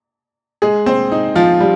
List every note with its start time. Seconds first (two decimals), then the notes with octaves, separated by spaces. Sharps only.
0.62 G#3 G#4
0.86 C4 C5
1.12 D#4
1.36 F3 F4
1.60 G3